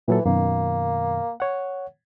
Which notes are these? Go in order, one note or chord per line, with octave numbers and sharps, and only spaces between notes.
A#2 E3 F#3 A4
F#2 B2 D#3 A#3
C#5 F#5